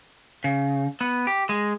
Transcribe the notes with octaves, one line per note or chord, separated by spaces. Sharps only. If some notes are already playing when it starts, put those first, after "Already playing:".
C#3
B3
G4
G#3